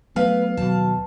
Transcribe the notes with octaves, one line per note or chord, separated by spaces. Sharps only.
F#3 A3 B3 B4 F5
D#2 B2 F#3 A5